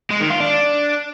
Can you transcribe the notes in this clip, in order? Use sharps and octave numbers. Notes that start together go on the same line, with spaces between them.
G#3
D#3
F4
D4